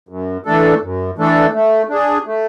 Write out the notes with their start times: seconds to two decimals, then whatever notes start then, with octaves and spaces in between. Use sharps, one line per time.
0.09 F#2
0.46 E3 A3 D4 A4
0.82 F#2
1.18 E3 A3 D4 A4
1.54 A3
1.89 D4 G#4
2.26 A3